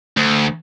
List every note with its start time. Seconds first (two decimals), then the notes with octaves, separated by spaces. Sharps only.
0.17 D2